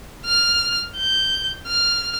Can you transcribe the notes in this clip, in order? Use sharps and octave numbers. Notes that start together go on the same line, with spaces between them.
F6
G6
F6